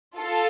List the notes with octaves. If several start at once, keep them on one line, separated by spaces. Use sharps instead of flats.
F4 A4